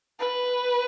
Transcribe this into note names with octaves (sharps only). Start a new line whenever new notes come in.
B4